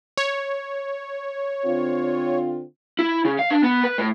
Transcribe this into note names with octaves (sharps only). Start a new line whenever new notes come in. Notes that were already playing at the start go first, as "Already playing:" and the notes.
C#5
D3 C4 F4
E4
C#3
F5
D4
B3
B4
A2